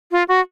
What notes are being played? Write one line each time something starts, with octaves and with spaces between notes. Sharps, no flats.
F4
F#4